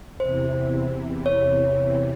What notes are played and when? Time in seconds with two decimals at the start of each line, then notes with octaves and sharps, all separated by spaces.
0.20 E2 C3 E3 C5
1.26 C#5